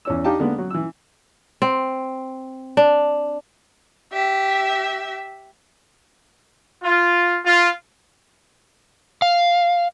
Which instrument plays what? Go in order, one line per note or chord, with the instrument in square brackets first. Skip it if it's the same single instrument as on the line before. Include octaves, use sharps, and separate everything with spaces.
[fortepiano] E2 C#4 E6
D4 D#4 G4 F5 G5 A5
D3 G#3 A#3 B3
F#3
E3 E6
[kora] C4
D4
[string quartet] G4 E5
[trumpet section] F4
F4
[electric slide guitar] F5